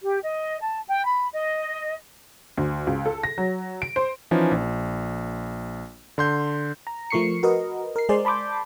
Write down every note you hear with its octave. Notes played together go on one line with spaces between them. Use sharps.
G4
D#5
A5
G5
B5
D#5
D2
C#2
A4
A#6
F#3
D7
C5
E3 F3 C#4 D#4
A#1
D3 C6 G6
A#5
F3 A3 A#4 C#6 C7 C#7
F#4 A#4 B4 D#5
A#4 C7
G#3 G#4 C5 D5
A5 B5 C6 D6 G6